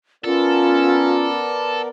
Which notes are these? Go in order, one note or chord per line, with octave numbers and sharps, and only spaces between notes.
B3 C#4 F4 A4 A#4 D5